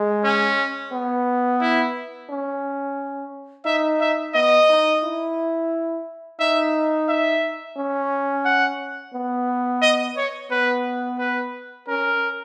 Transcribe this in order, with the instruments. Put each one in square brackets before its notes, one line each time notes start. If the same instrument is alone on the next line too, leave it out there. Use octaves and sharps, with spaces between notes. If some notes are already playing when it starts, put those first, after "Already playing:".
Already playing: [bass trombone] G#3
[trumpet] C#4
[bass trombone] B3
[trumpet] E4
[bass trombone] C#4
[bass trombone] D#4 [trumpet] E5
[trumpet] E5
[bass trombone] B3 [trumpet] D#5
[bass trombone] D#4
E4
[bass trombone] D#4 [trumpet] E5
[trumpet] E5
[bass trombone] C#4
[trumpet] F#5
[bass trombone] B3
[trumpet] D#5
C#5
[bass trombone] B3 [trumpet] B4
[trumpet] B4
[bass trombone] C#4 [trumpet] A#4